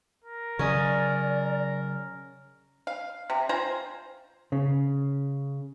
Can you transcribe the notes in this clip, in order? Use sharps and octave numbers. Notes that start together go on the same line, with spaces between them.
A#4
C#3 F#3 C#4 D5 D#5
F5
C3
F4 C5 G#5 A#5
C#3